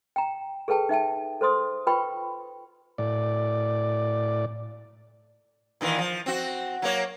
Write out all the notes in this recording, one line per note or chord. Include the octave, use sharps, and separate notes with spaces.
G5 A#5
G#4 A4 B4 G5 A5
D#4 E5 G5 A5
A4 C5 C6 D#6
F4 B4 G5 B5 C#6
A2 D5
A#2 D#3 E3
F3
C4 F#4
F#3 A#3 C#5